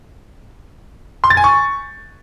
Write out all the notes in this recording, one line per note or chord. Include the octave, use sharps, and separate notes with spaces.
C6
A6
G#5
C#6